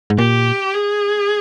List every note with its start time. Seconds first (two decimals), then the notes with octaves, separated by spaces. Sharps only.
0.10 G#2
0.18 A#2 G4
0.74 G#4